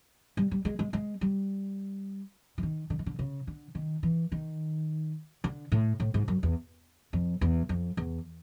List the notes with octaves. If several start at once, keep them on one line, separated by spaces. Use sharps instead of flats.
G3
G3
G#3
G#3
G#3
G3
E3
D#3
D3
D#3
D3
C#3
D3
D#3
E3
D#3
D3
A2
A2
G#2
F#2
E2
F2
E2
F2
E2